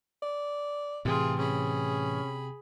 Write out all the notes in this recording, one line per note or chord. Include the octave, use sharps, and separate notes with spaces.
D5
A2 C3 E3 F4 G#4 G5
C#4 G#4 B5